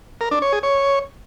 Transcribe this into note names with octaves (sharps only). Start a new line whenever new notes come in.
A#4
D4
C#5
G#4
C#5